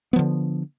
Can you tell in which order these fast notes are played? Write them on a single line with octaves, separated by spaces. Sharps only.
B3 F3 D3